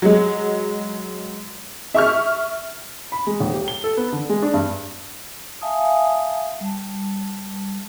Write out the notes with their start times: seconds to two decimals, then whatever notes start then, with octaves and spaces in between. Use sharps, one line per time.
0.02 F#3 G#3
1.94 E5 C#6 F6
3.12 B5
3.27 G#3
3.40 D#1
3.54 G4
3.68 G7
3.84 A4
3.97 B3
4.13 D3
4.29 G#3
4.42 D4
4.54 G2
5.62 E5 F5 G#5 A5 D#6
6.61 G3 A5